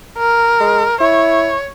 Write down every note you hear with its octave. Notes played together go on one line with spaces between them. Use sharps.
A#4
G#3
E4 C#5